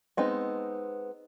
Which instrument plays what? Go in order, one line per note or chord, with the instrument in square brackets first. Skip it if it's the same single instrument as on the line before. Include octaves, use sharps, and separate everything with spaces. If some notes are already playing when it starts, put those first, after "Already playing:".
[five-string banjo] G#3 B3 C4 D#4